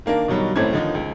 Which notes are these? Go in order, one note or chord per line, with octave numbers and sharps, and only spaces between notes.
D#3 A#3 D4 A#4
B2 D#3 F#3 G3
G#1 A2 A3 C4 C#4 G#6
D3 D#3 F3 D#4
C#2